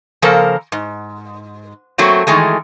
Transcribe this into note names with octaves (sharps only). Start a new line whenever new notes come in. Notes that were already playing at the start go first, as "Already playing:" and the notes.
C#3 F3 A#3 A4 A#4 C5
G#2
F#3 A3 A#3 C4
D#3 E3 G#3 A3